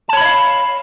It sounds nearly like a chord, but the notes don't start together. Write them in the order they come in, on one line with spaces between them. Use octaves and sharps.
A5 C#5 B5 D#5 F5